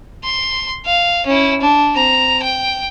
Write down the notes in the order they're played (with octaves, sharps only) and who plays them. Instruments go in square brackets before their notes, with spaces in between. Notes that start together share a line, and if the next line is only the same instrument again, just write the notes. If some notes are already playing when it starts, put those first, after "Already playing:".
[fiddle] C6
F5
C#4 E4
D4
C4 A#5
G5